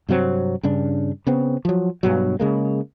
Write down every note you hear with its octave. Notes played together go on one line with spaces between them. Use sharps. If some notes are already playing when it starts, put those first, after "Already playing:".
G2 C3 F#3 C4
G2 C#3 D4
C#3 B3 C4
F3 F#3
G2 B2 F#3
C#3 G#3 A#3